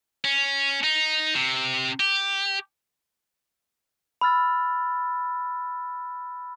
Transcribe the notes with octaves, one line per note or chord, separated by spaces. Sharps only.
C#4
D#4
C3
G4
B5 E6 F6 A6